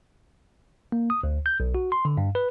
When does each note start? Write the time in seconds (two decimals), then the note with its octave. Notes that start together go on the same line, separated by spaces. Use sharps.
0.92 A#3
1.10 D#6
1.23 D2
1.46 G6
1.60 B1
1.75 F#4
1.92 C6
2.05 D3
2.17 G2
2.35 B4